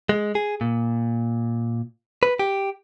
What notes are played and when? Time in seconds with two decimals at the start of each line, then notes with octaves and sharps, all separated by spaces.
0.09 G#3
0.35 G#4
0.61 A#2
2.23 B4
2.39 G4